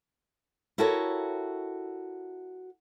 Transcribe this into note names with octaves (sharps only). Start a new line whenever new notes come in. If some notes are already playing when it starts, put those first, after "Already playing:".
E4 F#4 G4 A4 A#4 C#5